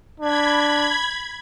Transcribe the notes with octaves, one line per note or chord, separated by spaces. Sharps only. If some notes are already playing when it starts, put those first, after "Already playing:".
D4 B5 G#6